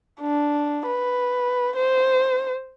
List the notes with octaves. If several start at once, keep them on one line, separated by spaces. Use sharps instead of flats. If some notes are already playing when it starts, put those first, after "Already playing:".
D4
B4
C5